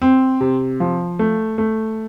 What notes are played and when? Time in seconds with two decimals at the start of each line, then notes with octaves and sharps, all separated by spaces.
0.02 C4
0.41 C3
0.80 F3
1.19 A3
1.58 A3